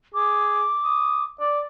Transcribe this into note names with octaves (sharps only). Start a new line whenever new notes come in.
G#4 D6
D#6
D5